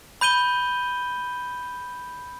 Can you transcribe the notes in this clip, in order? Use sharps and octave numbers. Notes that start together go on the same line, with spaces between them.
B5 G6 D#7 G7